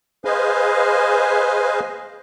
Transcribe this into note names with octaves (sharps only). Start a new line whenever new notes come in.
G#4 B4 C5 D#5 F5 G#5